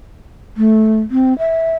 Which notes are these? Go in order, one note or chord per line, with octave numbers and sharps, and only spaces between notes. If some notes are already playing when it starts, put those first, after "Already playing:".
A3
C4
E5